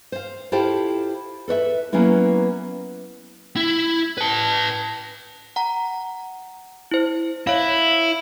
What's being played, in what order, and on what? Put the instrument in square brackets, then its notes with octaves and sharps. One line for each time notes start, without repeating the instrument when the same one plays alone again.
[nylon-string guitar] C5 F5
E4 F4 G4 A4 C5 F5
A4 B4 C#5 E5
F#3 A#3 B3 C#4 E4 B4
[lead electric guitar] E4
B4 A5
[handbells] F#5 A#5
E4 C5
[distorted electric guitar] E4 [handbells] C#5 F5